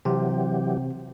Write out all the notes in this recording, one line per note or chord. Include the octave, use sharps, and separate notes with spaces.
C3 E3 F#3 C4 G4